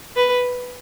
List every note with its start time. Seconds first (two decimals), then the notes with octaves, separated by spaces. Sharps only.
0.16 B4